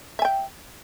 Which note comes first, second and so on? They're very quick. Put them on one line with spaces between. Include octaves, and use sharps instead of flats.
E5 G#5 G5